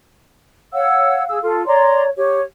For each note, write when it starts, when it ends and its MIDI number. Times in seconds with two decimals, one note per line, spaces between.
0.73 1.23 73
0.73 1.41 77
0.73 1.23 78
0.73 1.23 88
1.28 1.39 68
1.28 1.39 88
1.42 1.65 65
1.42 1.65 69
1.66 2.10 73
1.66 2.04 74
1.66 2.04 82
1.66 2.04 84
2.16 2.39 67
2.16 2.41 73